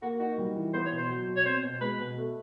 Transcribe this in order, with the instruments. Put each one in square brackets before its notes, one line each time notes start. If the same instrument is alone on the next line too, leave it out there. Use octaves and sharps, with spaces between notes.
[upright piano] A#3 [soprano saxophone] F#4
[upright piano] D#4 [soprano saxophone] F#4
[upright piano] G3
E3
[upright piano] B3 [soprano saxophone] C5
[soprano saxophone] C#5
[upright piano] B2
[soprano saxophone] C5
[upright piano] F#3
B2
[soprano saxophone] C#5
[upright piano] C4 [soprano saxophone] C5
[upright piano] B2
[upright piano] G#3 [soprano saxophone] B4
[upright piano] B2
A3